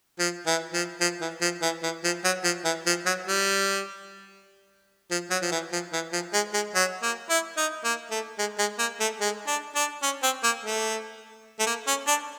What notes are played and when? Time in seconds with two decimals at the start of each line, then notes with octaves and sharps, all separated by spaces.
0.19 F3
0.46 E3
0.74 F3
1.00 F3
1.21 E3
1.41 F3
1.62 E3
1.83 E3
2.04 F3
2.24 F#3
2.44 F3
2.65 E3
2.86 F3
3.06 F#3
3.26 G3
5.11 F3
5.31 F#3
5.42 F3
5.52 E3
5.72 F3
5.93 E3
6.13 F3
6.33 G#3
6.53 G#3
6.75 F#3
7.02 A#3
7.30 E4
7.57 D#4
7.84 A#3
8.11 A3
8.38 G#3
8.58 G#3
8.79 A#3
9.00 A3
9.21 G#3
9.47 D4
9.75 D4
10.03 C#4
10.23 C4
10.43 A#3
10.64 A3
11.60 A3
11.67 A#3
11.87 C#4
12.07 D4